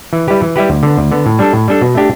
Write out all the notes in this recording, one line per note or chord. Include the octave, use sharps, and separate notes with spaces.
E3
G3 E4 G4 B4
E3
G3 E4 G4 B4
D2
D3 B3
D2
D3 B3
A2
G3 D4 A4
A2
G3 D4 A4
B2
A3 D4 G4